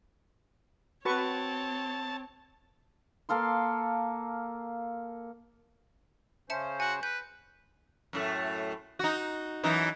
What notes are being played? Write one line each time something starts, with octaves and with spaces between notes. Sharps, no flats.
C4 F#4 B4 C#5 A5 C#6
A#3 A4 F5 C6
C#3 C#4 C5 E5 A5 C#7
F#4 G#5
B4 G6
F#2 A2 A3
D#4 F#4
F#2 E3 D#4